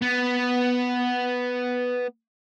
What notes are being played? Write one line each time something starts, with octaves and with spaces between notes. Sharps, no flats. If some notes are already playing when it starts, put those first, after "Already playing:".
B3